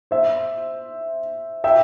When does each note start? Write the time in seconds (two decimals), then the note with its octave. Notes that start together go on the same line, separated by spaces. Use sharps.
0.11 C5 E5
1.64 E5 G5